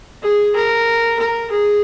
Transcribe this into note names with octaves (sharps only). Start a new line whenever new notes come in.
G#4
A#4
A#4
G#4